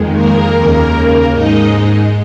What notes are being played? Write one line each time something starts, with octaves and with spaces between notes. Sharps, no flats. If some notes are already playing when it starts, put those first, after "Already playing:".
Already playing: F2 D#3 G#3
A#3 A#4
D#2 C#3 A#3
G#2 G#3 D#4 D#5